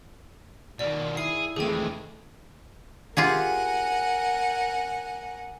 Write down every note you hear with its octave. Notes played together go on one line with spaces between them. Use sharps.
B2 D#3 A#3 D5
E4 G#4 C7
F2 D3 E3 G#3 A3 G#4 G5
F4 G4 G#4 A#4 F#5 G#5